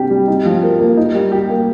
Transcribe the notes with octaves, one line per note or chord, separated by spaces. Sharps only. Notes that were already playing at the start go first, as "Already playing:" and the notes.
Already playing: C3 G3 D4 G4
G3
D#4
F3
A#4
A#3
D#4
G3
G4
A#3